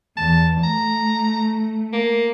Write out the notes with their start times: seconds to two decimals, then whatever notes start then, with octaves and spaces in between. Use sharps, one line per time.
0.17 E2 A5
0.63 A3 A#5
1.93 A#3